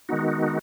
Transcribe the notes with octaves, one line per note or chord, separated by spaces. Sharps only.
D#3 G#3 B3 D#4 F#4